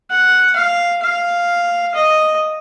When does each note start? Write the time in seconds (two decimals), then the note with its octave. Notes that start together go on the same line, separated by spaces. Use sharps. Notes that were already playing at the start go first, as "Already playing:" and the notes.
0.10 F#5
0.56 F5
1.02 F5
1.95 D#5